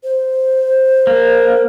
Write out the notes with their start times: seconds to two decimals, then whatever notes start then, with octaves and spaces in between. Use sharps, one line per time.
0.04 C5
1.07 A#3